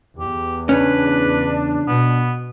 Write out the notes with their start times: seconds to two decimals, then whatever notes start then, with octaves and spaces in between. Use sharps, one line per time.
0.19 E2 G4
0.69 C#3 C#4 D4 B4
1.88 B2 B3